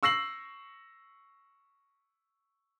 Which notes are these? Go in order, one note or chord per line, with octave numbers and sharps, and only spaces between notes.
C#6 E6 A#6 C7 F#7